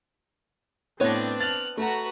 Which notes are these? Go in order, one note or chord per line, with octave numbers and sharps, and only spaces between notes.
A2 B3 C4 D4 C#5 A#6
F6 F#6 A6
A3 F#4 B4 A#5